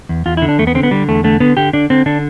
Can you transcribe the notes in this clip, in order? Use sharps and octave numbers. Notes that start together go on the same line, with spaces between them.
E2
E2 F4
E4
D3
D4
E2 A3
B3
D3 C4
B3
D3 G3
E2 A3
D3 A3
D3 B3
D3 G4
D3 D4
D3 C4
D3 D4